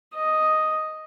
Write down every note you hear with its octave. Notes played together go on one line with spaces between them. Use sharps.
D#5